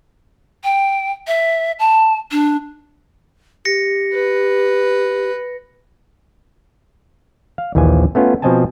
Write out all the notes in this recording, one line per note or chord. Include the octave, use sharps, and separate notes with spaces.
G5
E5
A5
D4
G4 A#6 C#7
B4
F5
A#1 D#2 E3 F3 G#5
A3 B3 C#4 F4
B2 F3 C4 D#5 G#5 A5